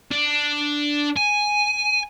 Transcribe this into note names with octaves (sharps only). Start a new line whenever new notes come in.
D4
G#5